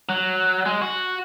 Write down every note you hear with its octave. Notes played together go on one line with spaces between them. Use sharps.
F#3
G#3
F#4